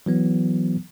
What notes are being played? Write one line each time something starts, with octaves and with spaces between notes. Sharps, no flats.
E3 F#3 B3